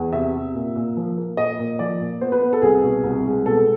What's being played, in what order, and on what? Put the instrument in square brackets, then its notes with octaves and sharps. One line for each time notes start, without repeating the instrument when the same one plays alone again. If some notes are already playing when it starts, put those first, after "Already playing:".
Already playing: [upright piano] E2
C3 E5
C3
A#2
A#2
F3
A#3
A#2 D#5
A#2
F3 D5
A#2
B3 C5
B4
B3
A4
C2 G#4
B2
C2
G#3
B2 A4